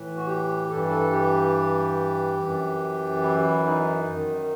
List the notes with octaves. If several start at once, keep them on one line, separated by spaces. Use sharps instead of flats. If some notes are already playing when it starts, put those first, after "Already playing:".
Already playing: A2 E3
F#4
G4
G2 E3 A4
A4
G4
F#2 E3
E4
D#4
F#2 D#3